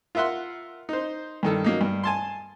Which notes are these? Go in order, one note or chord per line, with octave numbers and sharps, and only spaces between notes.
F4 A#4 E5 F#5 C6
D#4 C5
G2 D#3 A4
F#3 A#3 D#4
G2
G#5 A5 C6